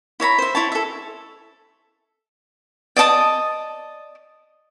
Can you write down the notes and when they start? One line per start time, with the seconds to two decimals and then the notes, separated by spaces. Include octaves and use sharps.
0.20 E4 C#5 A#5 B5
0.38 C5 E5
0.55 E4 C#5 A5
0.72 A4 E5
2.96 D5 D#5 A5 D#6